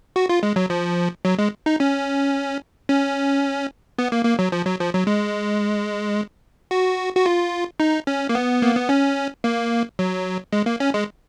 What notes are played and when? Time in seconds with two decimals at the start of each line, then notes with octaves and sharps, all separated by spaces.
0.16 F#4
0.29 F4
0.43 G#3
0.56 F#3
0.70 F3
1.25 F#3
1.39 G#3
1.66 D#4
1.80 C#4
2.89 C#4
3.98 B3
4.12 A#3
4.25 A#3
4.39 F#3
4.52 F3
4.66 F#3
4.80 F3
4.94 F#3
5.07 G#3
6.71 F#4
7.16 F#4
7.26 F4
7.80 D#4
8.07 C#4
8.29 A#3
8.35 B3
8.62 A#3
8.75 B3
8.89 C#4
9.44 A#3
9.99 F#3
10.53 G#3
10.66 A#3
10.80 C#4
10.94 G#3